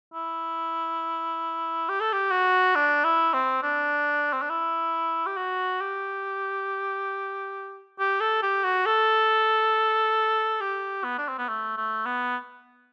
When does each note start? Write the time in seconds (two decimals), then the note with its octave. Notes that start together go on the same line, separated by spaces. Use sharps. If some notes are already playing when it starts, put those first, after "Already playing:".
0.14 E4
1.89 G4
2.01 A4
2.13 G4
2.31 F#4
2.75 D4
3.04 E4
3.34 C4
3.63 D4
4.33 C4
4.42 D4
4.50 E4
5.27 G4
5.37 F#4
5.81 G4
8.00 G4
8.21 A4
8.43 G4
8.64 F#4
8.86 A4
10.61 G4
11.04 B3
11.18 D4
11.29 C4
11.39 B3
11.49 A3
11.78 A3
12.06 B3